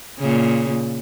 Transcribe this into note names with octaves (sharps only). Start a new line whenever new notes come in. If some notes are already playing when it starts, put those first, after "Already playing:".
A#2 C#3